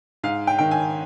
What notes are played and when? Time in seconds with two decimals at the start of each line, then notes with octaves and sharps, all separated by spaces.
0.23 G#2 F5
0.47 G5
0.58 D#3 G5
0.71 G#5